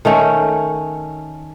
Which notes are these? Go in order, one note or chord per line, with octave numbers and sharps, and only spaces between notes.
D#3 A3 C#4